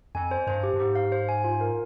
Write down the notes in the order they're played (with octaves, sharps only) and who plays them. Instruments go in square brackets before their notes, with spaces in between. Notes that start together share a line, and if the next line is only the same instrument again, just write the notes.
[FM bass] F2 [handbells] G#5
[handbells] C5
[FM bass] G2 [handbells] C5
[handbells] G4
[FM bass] G2
[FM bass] G#2 [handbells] G4
[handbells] F5
C5
G#5
F4
A#4